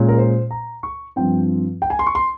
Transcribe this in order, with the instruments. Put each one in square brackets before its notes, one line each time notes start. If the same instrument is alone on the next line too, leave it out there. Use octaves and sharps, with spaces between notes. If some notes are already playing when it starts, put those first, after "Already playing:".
Already playing: [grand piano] A#2 G#3 C#4
A#4
C5
A#5
C#6
G2 F3 C4 G5
G5
G#5
C6
C#6
C6